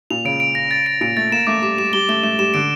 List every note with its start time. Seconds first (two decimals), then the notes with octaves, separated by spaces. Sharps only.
0.10 A#2 F7
0.25 C#3 D7
0.40 D7
0.55 A#6
0.71 A6
0.86 D7
1.01 A#2 D7
1.17 A3 A6
1.32 A#3 E7
1.47 A3 D6
1.62 G3 D6
1.78 G3 E7
1.93 G3 G7
2.09 A3 G7
2.23 A3 E7
2.39 G3 E7
2.54 D3 D7